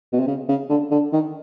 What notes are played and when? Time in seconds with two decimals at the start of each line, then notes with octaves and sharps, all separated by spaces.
0.13 B2
0.20 C3
0.27 C#3
0.49 C#3
0.69 D3
0.91 D3
1.13 D#3